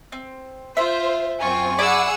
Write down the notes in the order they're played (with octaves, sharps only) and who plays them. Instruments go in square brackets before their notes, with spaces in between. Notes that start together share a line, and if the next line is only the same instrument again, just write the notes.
[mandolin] C4
[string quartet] F4 [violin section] C5 [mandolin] E5
[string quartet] F#2 G#5 C#6 [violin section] C4 F4
[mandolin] E4 D5 B5 [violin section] G#4 F#5 E6